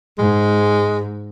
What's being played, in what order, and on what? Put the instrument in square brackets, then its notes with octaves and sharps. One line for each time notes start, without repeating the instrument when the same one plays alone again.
[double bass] G#2 [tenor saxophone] G#3